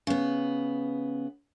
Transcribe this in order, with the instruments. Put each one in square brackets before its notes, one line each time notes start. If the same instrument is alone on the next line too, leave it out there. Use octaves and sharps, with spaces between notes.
[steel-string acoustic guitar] C#3 B3